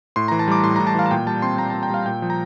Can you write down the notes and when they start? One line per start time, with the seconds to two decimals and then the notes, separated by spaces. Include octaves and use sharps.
0.16 A2 C6
0.28 E3 A#5
0.39 A5
0.48 G3 D6
0.64 A2 C6
0.76 A2 A#5
0.87 A5
0.95 E3 F5
1.06 A5
1.11 A#2 G5
1.27 G3 A5
1.42 C4 C6
1.58 A#2 A#5
1.70 A#2 A5
1.83 G5
1.90 G3 F5
2.06 A#2 G5
2.22 F3
2.30 A#5